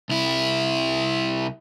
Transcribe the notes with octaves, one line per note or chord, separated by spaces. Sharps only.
C2 E4